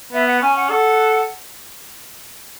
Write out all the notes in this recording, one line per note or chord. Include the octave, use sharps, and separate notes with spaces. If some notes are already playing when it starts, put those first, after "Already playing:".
B3 E5
F#5
C#4 G#5
F#5
A4 F#5